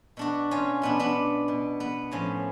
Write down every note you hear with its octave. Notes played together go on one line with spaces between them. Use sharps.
B2 D4 F#4
C#4 F4
B2 B3 D4
B3 D4
B2
B3
A2 F3 C#4